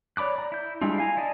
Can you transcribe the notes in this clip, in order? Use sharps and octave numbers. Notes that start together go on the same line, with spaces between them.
C#5 D5 B5 D6 F#6
D5 A#5
E4 G6
G3 G#3 D4 E4 F4
F5 G#5 A#5
E4 D5 D#5 A5